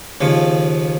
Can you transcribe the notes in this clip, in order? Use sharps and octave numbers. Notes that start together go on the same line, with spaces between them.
D#2 C#3 F3